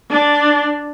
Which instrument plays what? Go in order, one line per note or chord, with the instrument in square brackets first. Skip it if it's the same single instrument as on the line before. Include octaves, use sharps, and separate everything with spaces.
[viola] D4